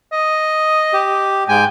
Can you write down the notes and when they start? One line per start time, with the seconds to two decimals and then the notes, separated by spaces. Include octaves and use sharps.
0.12 D#5
0.93 G4
1.48 G#2 G#3 G5 G#5